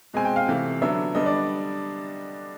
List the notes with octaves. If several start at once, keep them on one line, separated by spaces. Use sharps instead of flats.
B2 G#3 C4 G#5
G5
F5
C3 E3 A3
D3 F#3 B3 D4 E5
D3 G3 B3 D4 D#5
D5